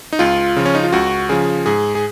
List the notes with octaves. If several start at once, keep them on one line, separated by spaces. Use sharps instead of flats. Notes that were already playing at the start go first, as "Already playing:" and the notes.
D#4
C#2 F4
C#3 F3
C#4
D#4
F4
C#2 F#4
C#3 F3 G#4
G#2 G#4
G#4